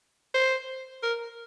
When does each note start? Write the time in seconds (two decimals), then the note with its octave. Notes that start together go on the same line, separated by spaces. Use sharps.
0.34 C5
1.03 A#4